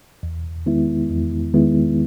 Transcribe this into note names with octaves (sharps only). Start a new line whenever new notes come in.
E2
D#3 G#3 B3 E4
E2
D#3 G#3 B3 E4